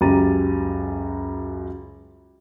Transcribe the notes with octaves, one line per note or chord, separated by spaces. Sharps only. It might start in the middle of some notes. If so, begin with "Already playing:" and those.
C#2 F#2 G4 A#5 A6 D#7